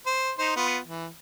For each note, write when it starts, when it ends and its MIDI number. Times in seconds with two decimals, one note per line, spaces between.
0.06 0.31 72
0.38 0.56 63
0.38 0.56 72
0.56 0.78 59
0.56 0.78 65
0.88 1.07 52